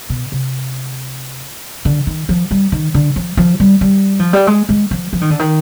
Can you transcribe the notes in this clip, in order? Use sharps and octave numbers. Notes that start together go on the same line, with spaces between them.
B2
C3
D3
D#3
F3
G3
D#3
D3
F3
F3
G3
G3
F3
G3
G#3
G#3
F3
F3
D#3
D3
D#3